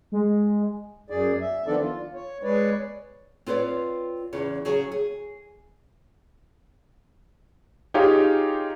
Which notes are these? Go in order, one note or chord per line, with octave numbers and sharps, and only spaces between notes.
G#3
F#2 G#4 D5
E5
D#3 F3 B3 D4 A4 D5
F4
C#5
G#3 B4 C#5 D5
C4 F4 B4 C#5 D5
E2 C#3
C#3 F#3 G#4
G#4
D#4 F4 G4 G#4 C#5 F5